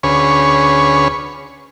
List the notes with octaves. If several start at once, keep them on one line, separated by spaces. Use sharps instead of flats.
D2 C#4 G#4 B4 C#5